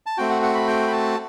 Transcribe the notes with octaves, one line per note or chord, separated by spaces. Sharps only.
A5
A3 C4 F#4 G5
F#5
F#5
B5
G5
B5
A5